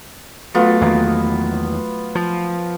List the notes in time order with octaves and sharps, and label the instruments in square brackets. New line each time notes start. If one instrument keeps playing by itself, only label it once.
[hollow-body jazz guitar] F#3 A3 [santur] B3 F4
[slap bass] E2 D#3 A#3
F3